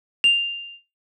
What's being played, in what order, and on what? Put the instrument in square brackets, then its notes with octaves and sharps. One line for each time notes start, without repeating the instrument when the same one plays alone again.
[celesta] F7